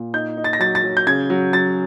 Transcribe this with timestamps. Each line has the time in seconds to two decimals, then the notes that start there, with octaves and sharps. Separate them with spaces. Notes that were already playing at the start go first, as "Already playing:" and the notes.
Already playing: A#2
0.14 D#4 G6
0.37 D#4
0.44 A6
0.53 A#6
0.59 F#3 A6
0.75 A6
0.84 F#3
0.97 G6
1.07 C#3 G#6
1.30 F#3
1.53 F#3 A6